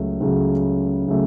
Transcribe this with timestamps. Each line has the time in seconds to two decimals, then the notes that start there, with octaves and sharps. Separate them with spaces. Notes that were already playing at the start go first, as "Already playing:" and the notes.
Already playing: C#2 C#3 F#3 A3
0.20 C#2 C#3 F#3 A3
1.08 C#3 F#3 A3